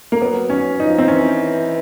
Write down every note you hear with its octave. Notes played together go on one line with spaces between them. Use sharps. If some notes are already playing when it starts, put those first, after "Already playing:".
A#3
F#3 B3
C#4
F3 D#4
C4
E3 C#4